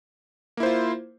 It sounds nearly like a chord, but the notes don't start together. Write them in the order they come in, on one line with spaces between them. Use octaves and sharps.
A#3 E4 C5 F4